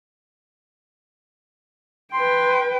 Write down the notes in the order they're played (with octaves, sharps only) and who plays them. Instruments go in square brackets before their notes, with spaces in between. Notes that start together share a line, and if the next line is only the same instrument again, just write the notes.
[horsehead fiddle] B4 G5 [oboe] C6